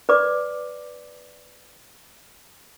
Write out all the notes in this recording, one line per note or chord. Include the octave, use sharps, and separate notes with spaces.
B4 D5 D6